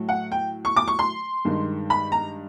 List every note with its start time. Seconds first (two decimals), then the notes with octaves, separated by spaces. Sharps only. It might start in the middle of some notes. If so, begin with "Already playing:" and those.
Already playing: A2 F#3 A3
0.09 F#5
0.32 G5
0.65 C#6
0.76 D6
0.88 C#6
0.99 C6
1.45 G2 D#3 G#3
1.90 B5
2.12 A#5